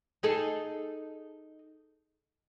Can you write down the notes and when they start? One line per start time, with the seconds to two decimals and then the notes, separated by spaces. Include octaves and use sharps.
0.23 D#4 G#4 A4